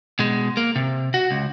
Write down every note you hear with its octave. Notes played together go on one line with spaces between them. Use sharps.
B2 G#3
A#3
C3
F#4
C#2